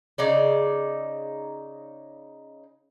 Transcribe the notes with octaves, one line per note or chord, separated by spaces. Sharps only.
C#3 D#4 D5